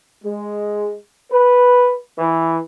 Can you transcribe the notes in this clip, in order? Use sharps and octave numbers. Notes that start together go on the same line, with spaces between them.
G#3
B4
E3